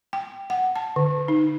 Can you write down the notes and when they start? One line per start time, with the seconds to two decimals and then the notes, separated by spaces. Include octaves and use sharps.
0.13 G5
0.50 F#5
0.76 A5
0.96 D3
1.28 D#4